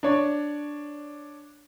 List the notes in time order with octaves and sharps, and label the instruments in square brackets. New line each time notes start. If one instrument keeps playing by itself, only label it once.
[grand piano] D4 C#5 D5